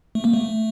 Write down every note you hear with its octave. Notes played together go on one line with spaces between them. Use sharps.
A3
A#3
A3